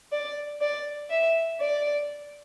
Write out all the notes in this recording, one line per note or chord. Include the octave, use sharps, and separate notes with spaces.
D5
D5
E5
D5